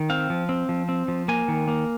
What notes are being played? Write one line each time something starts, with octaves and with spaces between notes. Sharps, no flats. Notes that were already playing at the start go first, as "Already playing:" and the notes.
Already playing: D#3
C4 F5
F3
C4
F3
C4
F3
A#3 G#5
D#3
A#3